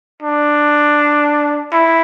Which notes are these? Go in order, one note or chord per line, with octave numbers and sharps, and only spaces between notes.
D4
E4